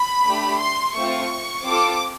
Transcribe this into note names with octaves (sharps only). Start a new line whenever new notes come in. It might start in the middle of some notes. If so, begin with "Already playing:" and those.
Already playing: B5
A3 D4 G4
C6
A3 C4 F4 C#6
C4 F4 A4 D6